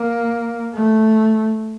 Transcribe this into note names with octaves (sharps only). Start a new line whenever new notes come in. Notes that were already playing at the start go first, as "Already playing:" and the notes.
Already playing: A#3
A3